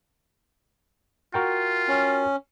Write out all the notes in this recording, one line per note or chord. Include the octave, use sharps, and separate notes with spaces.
F4 F#4 A#4 G5
C#4